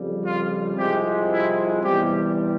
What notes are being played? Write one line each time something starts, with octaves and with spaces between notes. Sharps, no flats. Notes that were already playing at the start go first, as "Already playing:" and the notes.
Already playing: F2 C#3 G3
F4
C2 C3 F3 G#3 G4
E4
E2 C3 G3 G4